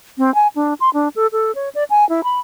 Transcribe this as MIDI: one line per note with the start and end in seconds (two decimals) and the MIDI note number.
0.18 0.34 60
0.35 0.48 80
0.56 0.74 62
0.80 0.90 84
0.94 1.08 62
1.16 1.27 69
1.32 1.54 69
1.55 1.69 73
1.75 1.84 74
1.90 2.07 80
2.09 2.21 64
2.24 2.40 83